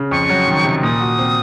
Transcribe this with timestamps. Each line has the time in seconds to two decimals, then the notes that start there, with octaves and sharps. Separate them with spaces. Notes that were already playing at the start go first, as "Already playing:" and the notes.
Already playing: C#3
0.11 F2 C#6
0.30 F#3
0.47 D#3
0.65 C3
0.83 A#2 D#6
1.01 F#4
1.19 C4